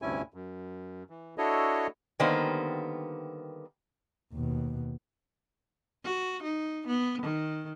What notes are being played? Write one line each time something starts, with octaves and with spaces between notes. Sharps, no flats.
D2 G2 C3 C#4 E4 G#5
F#2
E3
D4 E4 F#4 A4 C#5 D#5
D3 D#3 G3 A#3 B3 C5
D#2 B2
F#4
D#4
B3
D#3